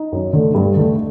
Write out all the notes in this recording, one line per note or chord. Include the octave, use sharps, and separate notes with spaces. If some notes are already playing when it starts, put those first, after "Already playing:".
Already playing: D#4
F#2
D3 A3
G2
D3 A3